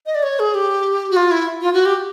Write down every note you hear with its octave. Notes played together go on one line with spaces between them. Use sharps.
D#5
D5
C#5
G#4
G4
F#4
F4
E4
F4
F#4
G4